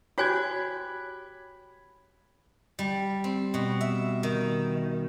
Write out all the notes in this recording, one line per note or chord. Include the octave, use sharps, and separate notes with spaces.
F#4 G4 C#5 G#5 B5 F#6 G#6
G3
C4
B2
E5
D#3